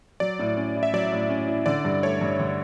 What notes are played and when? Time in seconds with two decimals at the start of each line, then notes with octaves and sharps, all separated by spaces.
0.20 F#3 D5
0.39 A2
0.57 C#4
0.76 E4
0.83 E5
0.93 F#3 D5
1.12 A2
1.29 C#4
1.47 E4
1.66 D3 D5
1.85 G2
2.03 A3 C#5
2.21 G2
2.39 D3